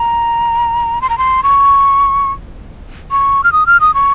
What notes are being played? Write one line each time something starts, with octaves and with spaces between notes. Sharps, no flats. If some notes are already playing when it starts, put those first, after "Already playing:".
Already playing: A#5
C6
A#5
C6
C#6
C#6
F6
D#6
F6
D#6
C#6